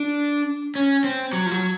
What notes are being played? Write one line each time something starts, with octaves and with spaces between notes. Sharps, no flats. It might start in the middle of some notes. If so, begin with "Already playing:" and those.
Already playing: D4
C#4
C4
F#3
F3
F#3